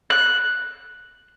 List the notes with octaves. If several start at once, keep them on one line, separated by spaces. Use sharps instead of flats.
F#6